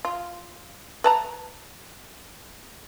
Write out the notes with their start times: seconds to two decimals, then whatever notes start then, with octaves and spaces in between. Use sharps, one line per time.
0.05 F4
1.04 B4 A5 A#5